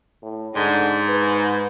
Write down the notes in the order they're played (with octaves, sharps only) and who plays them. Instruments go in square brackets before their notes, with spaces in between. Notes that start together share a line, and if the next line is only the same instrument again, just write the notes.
[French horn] A2
[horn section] G#2 [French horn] D3
[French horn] B4